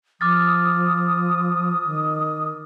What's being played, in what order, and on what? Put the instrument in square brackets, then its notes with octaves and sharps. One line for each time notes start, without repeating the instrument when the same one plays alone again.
[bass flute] F3 [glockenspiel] D6 F6 A6 [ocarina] D#6
[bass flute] D#3